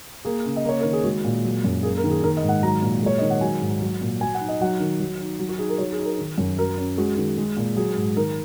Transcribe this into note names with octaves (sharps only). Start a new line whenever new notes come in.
A#3 G#4
C#3
D#5
A#3 C#5
D#3 A#4
G#4
G#3 F#4
A#2
F#3
F#2
A#3 G#4
A#4
D#3
G#4
D#3 A#4
D#5
G#2
F#5
F#3 A#5
A#2
G#3 C#5
D#3 D#5
F#5
F#3 G#5
G#2
F#3
A#2
F#3 G#5
F#5
D#4
D#5
F#3 F#5
D#3
F#3
D#4
F#3
F#4
D#4 G#4
A#4
F#3 C#5
G#4
D#4
A#4
D#3
F#2
F#3 A#4
C#4
G#3 F#4
D#3
G#3
A#2
F#3 G#4
G#2
D#3 A#4